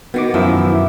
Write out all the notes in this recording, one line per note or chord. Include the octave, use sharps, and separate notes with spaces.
B2 D#3 B3 F#4 D6
F#2 F3 E4